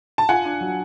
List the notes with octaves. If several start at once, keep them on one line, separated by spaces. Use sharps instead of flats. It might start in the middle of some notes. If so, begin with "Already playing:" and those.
A5
F4 F#5 G#5
D4
F#3